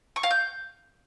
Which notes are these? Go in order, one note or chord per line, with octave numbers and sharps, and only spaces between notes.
C#6
F5
G6